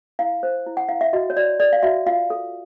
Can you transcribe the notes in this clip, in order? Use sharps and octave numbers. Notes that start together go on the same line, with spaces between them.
E4 F5
C5
E4
F#5
E4 F5
E5
F#4 D#5
C#5
F#4 D5
A4 D5
F5
F#4 E5
F4 F5
A4